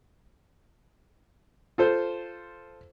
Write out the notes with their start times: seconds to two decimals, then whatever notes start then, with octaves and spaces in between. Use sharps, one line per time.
1.78 F4 A4 C5